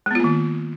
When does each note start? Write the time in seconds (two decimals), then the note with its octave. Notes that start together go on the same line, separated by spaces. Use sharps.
0.06 G#3
0.11 B3
0.15 F4
0.20 A#3
0.24 D#3